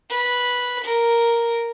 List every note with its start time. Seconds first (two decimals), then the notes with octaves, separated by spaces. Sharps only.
0.10 B4
0.85 A#4